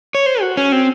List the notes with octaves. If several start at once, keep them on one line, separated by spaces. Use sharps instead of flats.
C#5
C5
F#4
C#4
C4